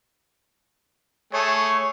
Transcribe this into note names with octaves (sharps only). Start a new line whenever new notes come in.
A3 G#4 C#5